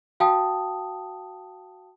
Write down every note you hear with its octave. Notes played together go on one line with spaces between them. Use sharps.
F#4 F5 G5 A5 D#6